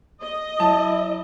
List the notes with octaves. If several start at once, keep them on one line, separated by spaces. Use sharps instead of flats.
D#5
F#3 E4 A5